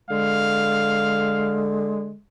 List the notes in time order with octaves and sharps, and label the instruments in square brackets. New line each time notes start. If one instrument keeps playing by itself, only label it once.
[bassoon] D3 [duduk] G#3 [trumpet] F5